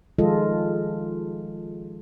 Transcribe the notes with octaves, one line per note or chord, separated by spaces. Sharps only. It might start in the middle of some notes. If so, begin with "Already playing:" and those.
D#3 F3 G#3 F4 A4 D#5